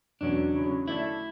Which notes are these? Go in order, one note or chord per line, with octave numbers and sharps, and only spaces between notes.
E2 B2 F#3 C#4 D4 F#4
C#3 F#3 C#4 E4
D3 A3 D4 E4